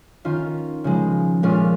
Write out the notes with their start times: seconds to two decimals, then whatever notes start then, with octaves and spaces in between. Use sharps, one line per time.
0.25 D#3 C#4 F4
0.84 C#3 F3 G#3
1.43 A#2 G#3 C#4 F4